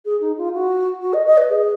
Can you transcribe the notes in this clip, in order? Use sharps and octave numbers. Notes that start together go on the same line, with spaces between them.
G#4
D#4
F4
F#4
F#4
D#5
D#5
B4
G#4